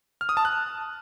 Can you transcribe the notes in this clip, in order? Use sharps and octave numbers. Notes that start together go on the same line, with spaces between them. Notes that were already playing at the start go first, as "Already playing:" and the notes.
F6
D#6
A5
F#6